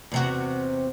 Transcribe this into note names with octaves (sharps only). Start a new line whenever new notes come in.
E2 C3 F#4